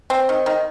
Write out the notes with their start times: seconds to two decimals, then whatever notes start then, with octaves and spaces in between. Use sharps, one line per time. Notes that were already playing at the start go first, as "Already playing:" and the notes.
0.10 C4
0.29 D#3
0.46 D#3